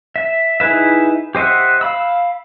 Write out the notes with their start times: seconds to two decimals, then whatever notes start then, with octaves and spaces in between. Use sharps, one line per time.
0.16 E5
0.60 D#4 E4 G#4 B4 E5
1.35 G4 C5 D#5 E5 F#5
1.81 F5 B5 E6